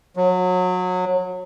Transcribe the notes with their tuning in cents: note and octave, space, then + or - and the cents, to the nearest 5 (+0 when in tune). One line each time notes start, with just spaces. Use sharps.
F#3 -25